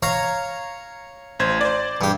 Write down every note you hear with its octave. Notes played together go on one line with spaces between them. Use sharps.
C#5 F5 A#5
A1 C5 G#6
C5 D5
G2 G4